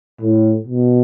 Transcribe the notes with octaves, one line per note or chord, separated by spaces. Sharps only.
A2
B2